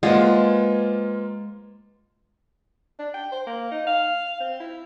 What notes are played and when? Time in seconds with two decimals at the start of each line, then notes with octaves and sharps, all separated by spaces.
0.03 G#3 A#3 F4 B4 C5 F#5
2.99 D4
3.14 G5
3.32 C5
3.47 A#3
3.72 D#4
3.87 F5
4.40 C4
4.60 E4